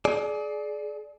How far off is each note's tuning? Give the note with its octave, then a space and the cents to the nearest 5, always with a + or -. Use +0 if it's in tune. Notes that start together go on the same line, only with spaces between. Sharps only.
G#4 +35 D5 +0